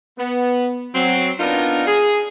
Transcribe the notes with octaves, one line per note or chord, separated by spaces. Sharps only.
B3
F#3 C4
B3 D4 D#4 F4 A#4
G#4